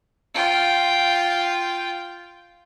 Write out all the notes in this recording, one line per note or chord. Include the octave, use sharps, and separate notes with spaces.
F4 G5